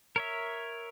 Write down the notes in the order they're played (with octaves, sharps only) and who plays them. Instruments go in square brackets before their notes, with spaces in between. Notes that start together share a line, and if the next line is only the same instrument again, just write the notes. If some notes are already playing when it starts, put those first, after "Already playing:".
[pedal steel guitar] A#4 C#5 E5